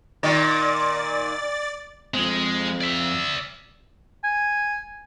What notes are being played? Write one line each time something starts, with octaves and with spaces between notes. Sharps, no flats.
A#2 D#3 D5 A6
F3 G#3 C4
D5 E5
G#5